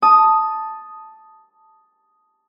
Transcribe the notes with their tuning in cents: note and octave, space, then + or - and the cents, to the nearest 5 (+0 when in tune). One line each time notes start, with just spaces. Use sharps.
A5 +0 D#6 +0